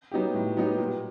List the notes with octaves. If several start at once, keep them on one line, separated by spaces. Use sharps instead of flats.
F#3 B3 D#4 G4
A2
F#3 B3 D#4 G4
A#2